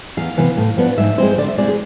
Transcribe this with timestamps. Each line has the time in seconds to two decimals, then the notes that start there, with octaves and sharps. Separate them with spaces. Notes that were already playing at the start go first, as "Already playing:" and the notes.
0.17 E2 F5
0.37 C3 E3 B3
0.57 A2
0.77 F3 B3 D4
0.98 G#2 E5
1.18 G#3 C4 E4 C5
1.38 D3 D5
1.48 E5
1.58 G#3 C4 E4 D5
1.68 G#4